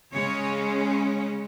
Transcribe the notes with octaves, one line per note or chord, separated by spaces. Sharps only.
C#3 G#3 C#4 C#5